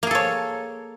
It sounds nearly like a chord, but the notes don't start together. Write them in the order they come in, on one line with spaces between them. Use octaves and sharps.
A#3 G#4 A4 C#5